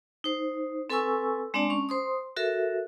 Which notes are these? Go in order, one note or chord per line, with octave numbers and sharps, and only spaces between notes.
D#4 C5
C4 A4 B4 G#5 C#6 E6
G#3 C4 D4 D5 A5
C#4 C#6
C5 C6 D#6
F#4 A4 A#4 E5